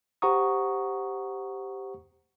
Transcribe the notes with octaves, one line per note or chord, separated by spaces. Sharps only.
G4 C5 F#5 A#5 C#6 D#6